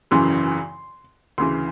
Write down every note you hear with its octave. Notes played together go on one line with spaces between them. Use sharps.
G#1 F#2 C#3 E3 C6
D2 C#3 E3 C6